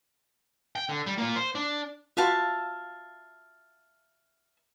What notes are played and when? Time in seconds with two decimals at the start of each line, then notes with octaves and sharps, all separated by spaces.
0.76 G5
0.89 D3
1.06 G3
1.18 A#3 F4
1.36 C5
1.55 D4
2.17 F4 F#4 E5 F5 A5 B5